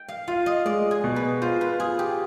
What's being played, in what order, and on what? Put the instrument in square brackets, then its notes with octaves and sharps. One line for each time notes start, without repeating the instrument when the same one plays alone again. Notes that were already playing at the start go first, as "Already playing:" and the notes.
Already playing: [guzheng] G5
F5
[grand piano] F4 [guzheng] F5
[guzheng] D#5
[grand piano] G#3 [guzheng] D5
[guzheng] G#4
[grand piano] B2
[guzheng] B4
[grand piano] F4 [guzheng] C5
[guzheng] B4
[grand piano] F4 [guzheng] G#4
[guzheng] G4